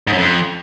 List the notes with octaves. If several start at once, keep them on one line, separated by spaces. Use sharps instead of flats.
G#2
F#2
F2